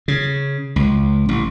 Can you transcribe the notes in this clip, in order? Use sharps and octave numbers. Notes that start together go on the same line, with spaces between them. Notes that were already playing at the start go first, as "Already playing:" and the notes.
C#3
C#2
A1